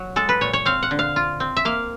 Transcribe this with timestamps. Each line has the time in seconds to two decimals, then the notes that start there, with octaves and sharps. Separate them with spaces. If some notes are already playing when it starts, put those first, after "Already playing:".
Already playing: F#3
0.16 G#3 A4
0.29 B4
0.41 A#2 C#5
0.53 C#5
0.66 C4 F5
0.83 F#5
0.91 D3
0.99 F5
1.16 F4
1.40 C4
1.57 E5
1.65 A#3 F5